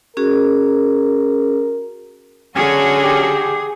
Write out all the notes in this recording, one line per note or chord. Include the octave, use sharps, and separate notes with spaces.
C#4 F#4 G#4 A#4
D3 F#3 C#4 F#4 G#4 A4
G4